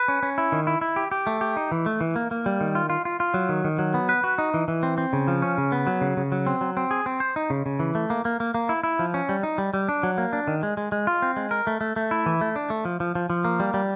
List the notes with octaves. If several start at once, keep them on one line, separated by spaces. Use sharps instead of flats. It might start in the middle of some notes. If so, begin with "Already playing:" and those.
Already playing: B4
C#4
C#4
E4
D#3
E4
E4
G4
G4
A3
G4
D#4
E3
A3
E3
A#3
A#3
G3
D#3
F4
F4
F4
F4
F#3
D#3
D#3
F#3
B3
B4
F#4
D#4
E3
E3
C4
C4
C#3
F3
C#4
C#3
B3
F#3
C#3
C#3
F#3
C4
F#3
C4
G#4
C4
C5
D#4
C#3
C#3
E3
A3
A#3
A#3
A#3
A#3
E4
E4
F3
C#4
G3
D#4
G3
G3
D4
F#3
A#3
D4
D#3
G#3
G#3
G#3
F4
C4
G#3
A#4
A3
A3
A3
E4
E3
A3
D4
A3
F3
F3
F3
F3
A#3
G3
G3